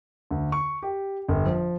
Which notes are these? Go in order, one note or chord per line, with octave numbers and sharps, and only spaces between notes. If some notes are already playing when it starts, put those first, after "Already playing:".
D2
C#6
G4
G1
F3